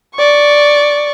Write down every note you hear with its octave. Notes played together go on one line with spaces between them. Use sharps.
D5 C#6